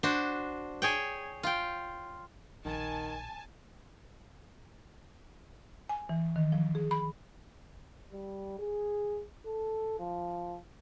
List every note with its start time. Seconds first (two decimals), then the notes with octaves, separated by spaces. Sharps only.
0.03 D4 F#4 C5
0.82 G#4 C#5 G5
1.43 F4 G5
2.65 A#1 D#3 G#5 A5
5.89 G#5
6.09 E3
6.36 D#3
6.52 F3
6.75 G#4
6.91 B5
8.12 G3
8.59 G#4
9.46 A4
9.99 F3